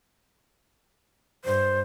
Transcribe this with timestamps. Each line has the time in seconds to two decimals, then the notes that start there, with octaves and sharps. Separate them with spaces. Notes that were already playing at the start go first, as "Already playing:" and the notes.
1.45 G2 C5